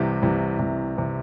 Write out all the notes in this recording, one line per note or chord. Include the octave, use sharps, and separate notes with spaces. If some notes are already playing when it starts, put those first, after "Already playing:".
Already playing: C2 C3 E3 G4
C2 C3 E3
C2 C3 E3
C3 E3